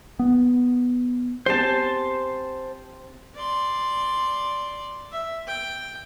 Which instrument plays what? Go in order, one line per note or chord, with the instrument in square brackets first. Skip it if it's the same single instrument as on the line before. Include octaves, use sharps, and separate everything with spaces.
[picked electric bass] B3
[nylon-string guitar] C4 G4 G#5 [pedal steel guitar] C5 A5
[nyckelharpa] D5 C6
E5
G5